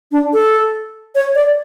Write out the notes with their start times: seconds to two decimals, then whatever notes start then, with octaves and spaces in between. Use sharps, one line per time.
0.12 D4
0.33 A4
1.15 C#5
1.35 D5